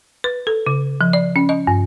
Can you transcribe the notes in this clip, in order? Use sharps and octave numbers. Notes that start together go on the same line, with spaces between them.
B4
A4
C#3
F3
D5
C#4
D#5
G2